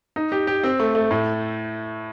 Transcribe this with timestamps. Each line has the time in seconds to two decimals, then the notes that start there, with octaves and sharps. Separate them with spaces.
0.16 D#4
0.32 G4
0.47 G4
0.64 C4
0.79 A3
0.95 A3
1.11 A2